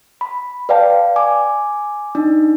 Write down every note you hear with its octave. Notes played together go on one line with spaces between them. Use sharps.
B5
B4 D5 F5 G5 A5
G#5 D6
D4 D#4